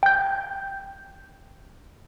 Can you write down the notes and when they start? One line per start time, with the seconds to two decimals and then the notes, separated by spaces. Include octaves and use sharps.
0.03 G5 G6